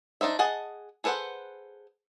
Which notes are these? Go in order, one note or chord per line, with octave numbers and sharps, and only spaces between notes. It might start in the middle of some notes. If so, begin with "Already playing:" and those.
D4 D#4 C5 E5
G#4 D#5 F#5 A5
G#4 A4 B4 C5 F#5